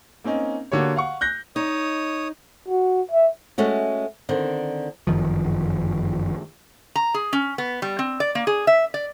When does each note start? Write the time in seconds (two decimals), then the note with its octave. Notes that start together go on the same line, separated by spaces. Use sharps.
0.24 A#3 C4 C#4 D#4
0.72 D3 A#3 F#4 G4 C#5
0.96 F5 F#5 C#6
1.21 F#6 G6 A#6
1.56 D#4 C#5 D#6
2.68 F#4
3.11 E5
3.58 G#3 A3 C#4 F#4
4.29 D3 D#3 C4
5.07 G1 F#2 D#3 F3
6.96 A#5
7.14 G#4
7.33 C#4
7.58 B3
7.82 G3
7.99 C4
8.20 D5
8.35 A#3
8.47 G#4
8.67 E5
8.94 D5